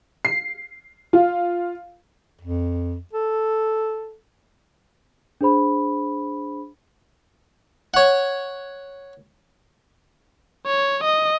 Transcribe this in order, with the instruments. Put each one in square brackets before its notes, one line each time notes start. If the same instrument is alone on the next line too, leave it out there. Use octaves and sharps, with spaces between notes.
[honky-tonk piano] C7
F4
[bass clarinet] F2
A4
[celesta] D4 G#4 C5 B5
[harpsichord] C#5 F#5
[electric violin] C#5
D#5